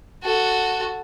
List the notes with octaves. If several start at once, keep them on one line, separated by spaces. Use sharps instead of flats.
F#4 A4